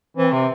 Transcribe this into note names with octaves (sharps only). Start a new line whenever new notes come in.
E3 C4
C3